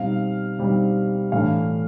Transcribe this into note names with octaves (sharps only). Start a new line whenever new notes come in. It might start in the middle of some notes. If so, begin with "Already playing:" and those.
Already playing: B2 G3 C4 D#4 F5
B2 G3 C4 D#4
A2 E3 A3 D4 F5